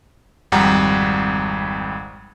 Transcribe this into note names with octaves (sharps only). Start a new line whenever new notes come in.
G#1 F2 G3 F#5 A#5